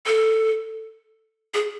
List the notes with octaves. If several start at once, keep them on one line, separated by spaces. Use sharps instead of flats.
A4
G#4